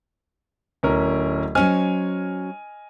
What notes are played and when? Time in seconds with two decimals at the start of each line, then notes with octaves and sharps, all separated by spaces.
0.83 D1 C#4 A#4
1.55 F#3 C#4 C5 D#5 G#5 F6